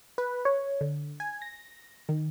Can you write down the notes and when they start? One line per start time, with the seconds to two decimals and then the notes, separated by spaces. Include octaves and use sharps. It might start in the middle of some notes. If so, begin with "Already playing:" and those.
0.18 B4
0.45 C#5
0.81 D3
1.20 G#5
1.42 A#6
2.09 D#3